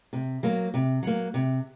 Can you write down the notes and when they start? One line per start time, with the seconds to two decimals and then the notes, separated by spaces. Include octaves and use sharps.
0.13 C3
0.43 F#3 A#3
0.74 C3
1.03 F#3 A#3
1.34 C3